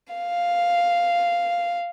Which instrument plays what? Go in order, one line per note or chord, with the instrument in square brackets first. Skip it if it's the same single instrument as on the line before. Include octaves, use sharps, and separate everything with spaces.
[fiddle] F5